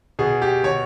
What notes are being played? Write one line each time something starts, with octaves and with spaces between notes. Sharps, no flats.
B2 G#4
G4
B2 C#5